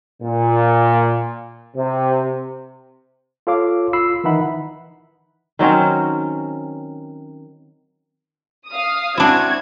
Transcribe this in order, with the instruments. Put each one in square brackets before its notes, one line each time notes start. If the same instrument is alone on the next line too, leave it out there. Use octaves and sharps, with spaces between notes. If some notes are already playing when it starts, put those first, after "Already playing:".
[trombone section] A#2
C3
[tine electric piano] F4 A4 C#5 F5 D6
F4 B5 E6 C7
D#3 E3 D#4 E5 F#5 B5
[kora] D#3 F#3 C4 C#4
[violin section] F5 D#6
[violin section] C4 F#4 G#6 [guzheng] D4 E4